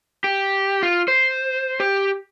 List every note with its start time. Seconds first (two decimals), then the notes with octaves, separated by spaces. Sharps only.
0.24 G4
0.83 F4
1.08 C5
1.80 G4